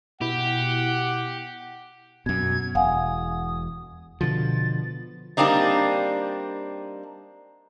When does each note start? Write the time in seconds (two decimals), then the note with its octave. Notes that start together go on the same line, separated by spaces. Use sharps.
0.21 B2 E4 G4 F#5
2.26 F#2 B2 G#6
2.75 E1 F5 F#5 G#5 D#6
4.21 B2 D3 F3 A6
5.37 G3 A#3 C4 D4 D#4